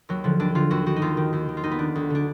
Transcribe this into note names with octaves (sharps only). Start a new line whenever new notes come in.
D#2 F#3
D3 F3
D#2 D4
D3 F4
D#2 F#4
D#3 F#4
D#4
D#2 F4
D#3
D#2
D#3
F4
D#2 D#4
B3
D#3 D4
D2
D3 D4